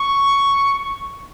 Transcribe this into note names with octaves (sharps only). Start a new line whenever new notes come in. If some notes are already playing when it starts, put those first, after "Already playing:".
Already playing: C#6